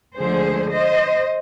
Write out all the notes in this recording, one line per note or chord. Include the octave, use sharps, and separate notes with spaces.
D2 D3 F3 G#3 G#4 C5
C5 D#5